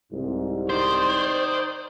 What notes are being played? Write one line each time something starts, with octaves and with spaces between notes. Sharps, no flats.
C2 G#2
D#3 C5 D5